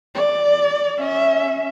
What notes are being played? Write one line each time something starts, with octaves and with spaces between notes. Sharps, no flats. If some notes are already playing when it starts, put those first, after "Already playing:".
D5
C#4 E5